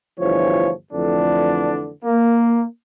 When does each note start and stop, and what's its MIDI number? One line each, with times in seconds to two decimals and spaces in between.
0.19 0.71 31
0.19 0.71 38
0.19 0.71 52
0.19 0.71 53
0.19 0.71 73
0.93 1.90 41
0.93 1.90 50
0.93 1.90 52
0.93 1.90 57
0.93 1.90 62
2.05 2.63 58